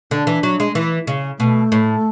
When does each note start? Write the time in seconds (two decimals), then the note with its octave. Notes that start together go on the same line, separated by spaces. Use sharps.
0.11 D3 D4
0.27 E3
0.43 F#3
0.60 G#3
0.75 E3
1.07 C#3
1.39 B2 A3
1.72 A2